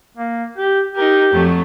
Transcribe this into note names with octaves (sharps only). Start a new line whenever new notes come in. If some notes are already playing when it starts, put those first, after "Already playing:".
A#3
G4
D#4 G4 A#4
F2 F#3 A3